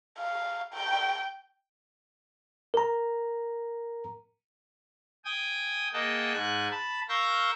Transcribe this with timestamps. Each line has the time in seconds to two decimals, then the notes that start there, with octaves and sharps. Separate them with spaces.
0.19 F5
0.74 G5
2.74 A#4 A#5
5.25 G5 G#5 D#6
5.93 A#3 G#4 D#5 F#5 G5 A5
6.33 G#2 G#5 F#6
6.71 A5 B5
7.09 A#4 F5 C#6 E6 G6 A#6